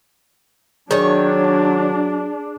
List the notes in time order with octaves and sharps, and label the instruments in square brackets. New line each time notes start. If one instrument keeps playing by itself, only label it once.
[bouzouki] D#3 C#5 [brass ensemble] F#3 [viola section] D4 [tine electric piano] G#4 D5